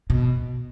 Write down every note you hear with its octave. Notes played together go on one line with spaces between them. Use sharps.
B2